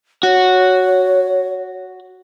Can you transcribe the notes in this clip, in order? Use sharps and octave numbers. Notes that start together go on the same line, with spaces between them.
F#4 C#5